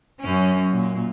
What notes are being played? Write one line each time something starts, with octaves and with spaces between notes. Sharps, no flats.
F#2 C#4
A#2